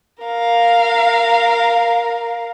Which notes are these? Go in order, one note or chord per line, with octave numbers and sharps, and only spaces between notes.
A#4 F5